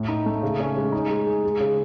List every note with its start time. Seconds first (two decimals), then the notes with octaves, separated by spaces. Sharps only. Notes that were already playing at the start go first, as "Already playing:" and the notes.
Already playing: A2
0.08 D#4
0.26 A3
0.42 C#3
0.60 C#4
0.77 G#3
0.92 D#4
1.09 G#3
1.27 G#4
1.44 G#3
1.60 C#3